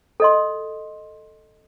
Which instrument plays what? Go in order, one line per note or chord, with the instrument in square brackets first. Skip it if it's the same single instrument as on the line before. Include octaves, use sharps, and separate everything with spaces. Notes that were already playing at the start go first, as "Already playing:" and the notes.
[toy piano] A4 D#5 C6